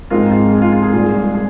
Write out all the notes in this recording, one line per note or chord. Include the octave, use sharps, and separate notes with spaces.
G#2 F3 G#3 C4 D#4 F4 A#4
F4
G#4
F4
F4
G#4
C2 A#2 G#3
G#4